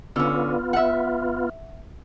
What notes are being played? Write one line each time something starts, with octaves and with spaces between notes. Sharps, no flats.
D3 B3 C#4 F4
E5 F#5